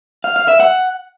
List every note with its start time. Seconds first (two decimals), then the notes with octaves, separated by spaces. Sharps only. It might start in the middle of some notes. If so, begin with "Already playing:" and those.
0.24 F5
0.36 F5
0.48 E5
0.60 F#5